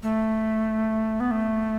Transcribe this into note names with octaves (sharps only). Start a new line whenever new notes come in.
A3
B3
A3